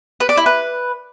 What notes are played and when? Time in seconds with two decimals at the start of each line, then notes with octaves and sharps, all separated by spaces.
0.20 B4
0.29 D5
0.37 E4
0.46 B4